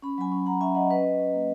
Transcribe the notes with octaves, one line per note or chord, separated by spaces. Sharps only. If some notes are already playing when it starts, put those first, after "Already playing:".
C#4 B5
F#3 G#5 B5
C#4
C#4 F#5 A#5
C#4 E5 G#5
F#3 D#5 F#5
C#4 B4 D#5
C#4
C#4
A#3